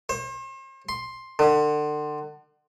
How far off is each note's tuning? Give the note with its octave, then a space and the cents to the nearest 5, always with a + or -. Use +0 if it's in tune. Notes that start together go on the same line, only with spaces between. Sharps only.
C5 +40
C6 +10
D3 +35